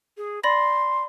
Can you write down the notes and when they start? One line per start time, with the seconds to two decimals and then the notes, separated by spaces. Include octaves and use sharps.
0.17 G#4
0.44 D5 B5 C6 A#6